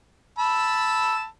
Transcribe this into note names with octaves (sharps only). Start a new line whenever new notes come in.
A5 B5 E6